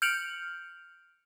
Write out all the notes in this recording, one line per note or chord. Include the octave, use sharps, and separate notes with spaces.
F6 G6 C#7 D7 F7 F#7